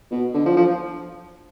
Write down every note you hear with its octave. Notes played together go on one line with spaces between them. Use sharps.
B2
D3
F3
F3